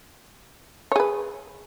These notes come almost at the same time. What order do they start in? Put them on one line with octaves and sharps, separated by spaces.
C#5 G#4 B4